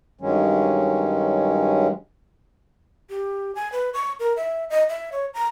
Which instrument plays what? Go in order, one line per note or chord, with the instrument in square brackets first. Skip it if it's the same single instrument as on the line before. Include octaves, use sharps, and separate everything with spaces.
[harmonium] G2 D#3 F#3 G#3 C#4
[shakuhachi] G4
G#5
B4
C#6
A#4
E5
D#5
E5
C#5
A#5